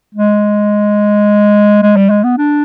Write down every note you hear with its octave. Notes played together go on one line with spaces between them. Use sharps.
G#3
G#3
G3
G#3
B3
D4